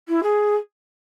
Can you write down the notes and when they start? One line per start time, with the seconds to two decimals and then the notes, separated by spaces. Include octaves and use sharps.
0.08 E4
0.23 G#4